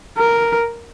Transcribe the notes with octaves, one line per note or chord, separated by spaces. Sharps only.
A#4